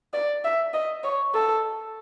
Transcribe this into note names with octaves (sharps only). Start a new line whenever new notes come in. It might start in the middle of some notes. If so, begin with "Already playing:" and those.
D5
E5
D#5
C#5
A4